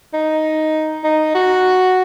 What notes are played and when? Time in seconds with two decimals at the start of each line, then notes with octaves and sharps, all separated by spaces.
0.14 D#4
1.04 D#4
1.35 F#4